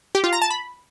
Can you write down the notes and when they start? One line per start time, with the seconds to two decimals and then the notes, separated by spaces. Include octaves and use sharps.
0.15 G4
0.24 F4
0.33 A#5
0.42 A5
0.50 B5